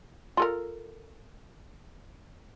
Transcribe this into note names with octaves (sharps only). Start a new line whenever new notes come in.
F4 A4 A#4